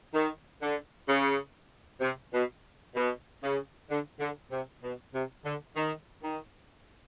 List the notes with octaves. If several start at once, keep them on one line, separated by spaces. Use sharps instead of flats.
D#3
D3
C#3
C3
B2
B2
C#3
D3
D3
C3
B2
C3
D3
D#3
D#3